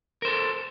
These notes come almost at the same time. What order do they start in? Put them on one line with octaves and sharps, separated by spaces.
A#4 C5 A4